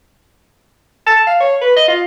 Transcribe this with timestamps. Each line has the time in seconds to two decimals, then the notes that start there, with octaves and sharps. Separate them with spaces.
1.07 A5
1.27 F5
1.40 C#5
1.62 B4
1.77 D#5
1.88 F4